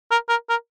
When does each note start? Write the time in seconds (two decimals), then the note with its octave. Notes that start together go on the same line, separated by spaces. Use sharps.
0.11 A#4
0.29 A#4
0.49 A#4